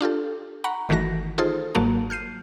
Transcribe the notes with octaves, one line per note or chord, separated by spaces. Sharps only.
D4 F4 G4 A4
F#5 A#5 B5 C#6
G1 D#3 E3 A3 F#4 A#6
D#4 F4 G#4 A4 C5
G1 G#2 F#3 A#3 F#4 A5
F6 G6 C7 D#7